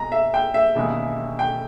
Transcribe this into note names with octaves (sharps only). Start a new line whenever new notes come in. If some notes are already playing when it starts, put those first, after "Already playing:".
Already playing: B2 G#3 A#5
E5
G5
E5
E1 D#2 C#3 G#3
G5